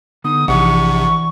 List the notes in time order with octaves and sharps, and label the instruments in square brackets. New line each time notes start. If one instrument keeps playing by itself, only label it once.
[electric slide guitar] D3 B3 D#4 [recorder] D#6
[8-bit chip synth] A#1 C3 [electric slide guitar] E3 D5 F#5 [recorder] C#6